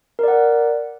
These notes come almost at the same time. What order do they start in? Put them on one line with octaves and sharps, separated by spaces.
A#4 D5 F#5